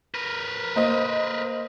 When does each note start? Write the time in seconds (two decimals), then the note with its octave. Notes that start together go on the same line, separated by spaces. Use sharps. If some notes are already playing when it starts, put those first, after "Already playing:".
0.14 A#4 B4
0.76 A#3 C5 D#5